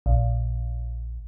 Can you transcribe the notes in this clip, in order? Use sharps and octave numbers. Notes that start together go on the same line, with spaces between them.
A#1